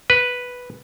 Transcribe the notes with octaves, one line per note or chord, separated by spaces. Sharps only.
B4